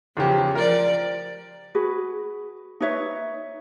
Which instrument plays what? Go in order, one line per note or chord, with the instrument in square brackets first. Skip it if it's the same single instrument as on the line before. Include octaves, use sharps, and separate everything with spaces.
[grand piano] E2 C#3 G4 [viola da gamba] F3
[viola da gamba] F3 D5 [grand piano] A#4
[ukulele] F#4 G#4 B4
D#4 B4 C#5 E5